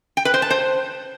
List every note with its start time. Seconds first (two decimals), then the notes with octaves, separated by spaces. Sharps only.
0.17 G5
0.25 B4
0.34 C5
0.42 A5
0.51 C5